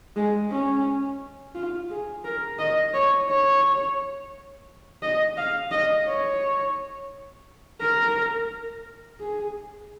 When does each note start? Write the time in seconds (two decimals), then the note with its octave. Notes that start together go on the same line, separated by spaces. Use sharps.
0.16 G#3
0.50 C#4
1.55 F4
1.90 G#4
2.25 A#4
2.59 D#5
2.94 C#5
3.29 C#5
5.03 D#5
5.37 F5
5.72 D#5
6.07 C#5
7.80 A#4
9.20 G#4